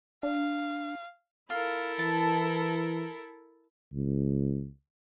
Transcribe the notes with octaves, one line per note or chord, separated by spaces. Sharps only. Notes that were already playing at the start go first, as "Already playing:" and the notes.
D4 F5
E4 F4 A4 A#4
E3 A5
C#2